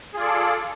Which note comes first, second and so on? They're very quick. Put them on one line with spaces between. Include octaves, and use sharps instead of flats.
G#4 F4 D5 A4